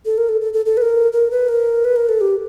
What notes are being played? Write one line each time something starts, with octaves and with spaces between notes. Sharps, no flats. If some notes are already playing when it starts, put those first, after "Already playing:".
A4
A#4
A4
A4
A4
A4
B4
A#4
A#4
B4
A#4
B4
A#4
A4
G4